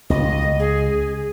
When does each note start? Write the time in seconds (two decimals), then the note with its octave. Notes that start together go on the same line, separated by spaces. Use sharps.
0.10 C#2 D#5
0.59 G#4